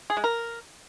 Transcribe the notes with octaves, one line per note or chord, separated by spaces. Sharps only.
G#4
G#3
A#4